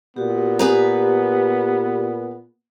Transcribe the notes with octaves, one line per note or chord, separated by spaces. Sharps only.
A#2 B3 F#4 G4
G4 G#4 B4 A#5